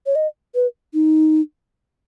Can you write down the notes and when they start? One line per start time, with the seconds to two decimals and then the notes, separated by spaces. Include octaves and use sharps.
0.06 C#5
0.15 D#5
0.55 B4
0.94 D#4